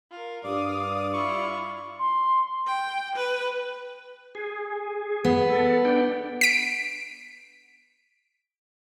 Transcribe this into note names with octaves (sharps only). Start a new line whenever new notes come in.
F4 A#4
G2 D5 F5 D#6
E4 F4 C#6
C6
G5
B4
G#4
B3
A4
D4 G5
B6 D7